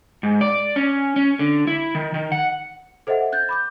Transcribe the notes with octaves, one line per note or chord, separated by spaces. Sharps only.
G#2
D5
C#4
C#4
D3
E4
D#3
D#3
F#5
A4 C5 D#5 E5 F#5
F#6 G6 A6
B5 D6 G6